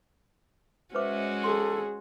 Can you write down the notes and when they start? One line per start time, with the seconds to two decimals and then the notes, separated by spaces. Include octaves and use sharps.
0.95 G#3 C#4 F#4 B4 C5 E5 D6
1.44 G#4 A4 C6